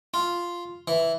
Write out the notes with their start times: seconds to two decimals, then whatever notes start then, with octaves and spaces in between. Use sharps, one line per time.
0.14 F4
0.88 E3